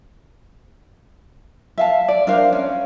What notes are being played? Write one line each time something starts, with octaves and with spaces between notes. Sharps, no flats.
E5 F5 A5
D5
D4 A#4 C5 F5
C#4